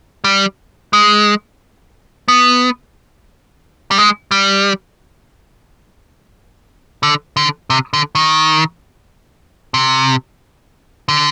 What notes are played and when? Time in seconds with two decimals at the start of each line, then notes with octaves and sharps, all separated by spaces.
0.24 G3
0.93 G#3
2.28 B3
3.91 G3
3.98 G#3
4.31 G3
7.03 D3
7.37 D3
7.70 C3
7.93 D3
8.15 D#3
9.74 C3
11.09 D3